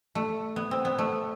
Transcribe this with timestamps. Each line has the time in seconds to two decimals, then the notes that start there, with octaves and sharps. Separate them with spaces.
0.15 A3
0.56 B3
0.71 C4
0.85 B3
0.99 A3